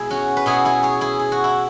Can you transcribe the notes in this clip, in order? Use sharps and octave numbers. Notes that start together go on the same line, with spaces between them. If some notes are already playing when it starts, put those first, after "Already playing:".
Already playing: B2 G#3 E4 G#4
C#4 F#4
B4
B2 B3 E4 G#4
E4 G#4
G#4 C#5
E4 G#4
G#4
F#4
E4